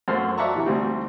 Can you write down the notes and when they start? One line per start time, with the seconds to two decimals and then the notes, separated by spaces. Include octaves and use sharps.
0.08 F#2 A3 F#4 C5 F6
0.38 D5 E5 F#5 A5 A#5 C#6
0.54 C3 E3
0.66 D2 G3 C4 D#4